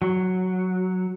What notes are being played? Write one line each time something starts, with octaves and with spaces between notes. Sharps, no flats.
F#3